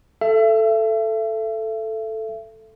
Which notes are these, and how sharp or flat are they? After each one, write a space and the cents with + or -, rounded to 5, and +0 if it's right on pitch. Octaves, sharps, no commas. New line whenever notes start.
A4 +0 E5 +35